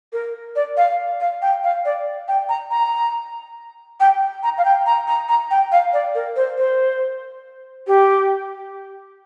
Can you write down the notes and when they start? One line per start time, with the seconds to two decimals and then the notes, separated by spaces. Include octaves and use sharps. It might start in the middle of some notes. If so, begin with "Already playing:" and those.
0.13 A#4
0.56 D5
0.77 F5
1.20 F5
1.42 G5
1.63 F5
1.85 D5
2.28 G5
2.49 A#5
2.71 A#5
4.00 G5
4.43 A#5
4.58 F5
4.65 G5
4.86 A#5
5.08 A#5
5.29 A#5
5.51 G5
5.72 F5
5.93 D5
6.15 A#4
6.36 C5
6.58 C5
7.87 G4